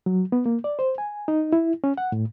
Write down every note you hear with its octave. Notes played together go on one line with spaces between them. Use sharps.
F#3
B3
A#3
D5
C5
G#5
D#4
E4
C#4
F#5
A2